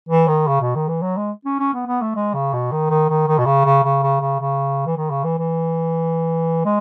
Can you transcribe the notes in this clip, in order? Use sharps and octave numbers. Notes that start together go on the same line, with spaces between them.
E3
D#3
C#3
B2
D#3
E3
F#3
G#3
C#4
C#4
B3
B3
A3
G#3
C#3
B2
D#3
D#3
D#3
D#3
B2
C#3
C#3
C#3
C#3
C#3
C#3
E3
D#3
C#3
E3
E3
G#3